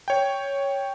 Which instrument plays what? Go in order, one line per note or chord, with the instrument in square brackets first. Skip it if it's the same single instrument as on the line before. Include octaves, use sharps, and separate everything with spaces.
[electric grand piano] C#5 G5